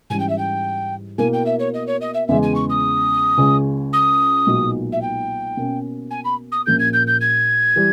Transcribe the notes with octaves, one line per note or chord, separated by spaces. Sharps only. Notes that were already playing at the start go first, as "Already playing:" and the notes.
G#2 E3 G3 C#4 G#5
G5
E5
G5
B2 A#3 E4 G#5
G5
E5
C#5
D#5
C#5
D#5
E5
E2 C#3 G#3 E5
G#5
C#6
D#6
C#2 C#3 G#3 C#4
D#6
B1 A#2 G#3 D#4
E5
G5
B2 A#3 C#4
G#5
B5
D#6
A#1 A#2 A#3 C#4 G6
G#6
G6
G6
G#6
E3 G3